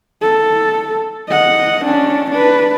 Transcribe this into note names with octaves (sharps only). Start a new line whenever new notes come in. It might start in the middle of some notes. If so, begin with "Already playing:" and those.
A4
D#5 F#5
C#4 D4
D4 B4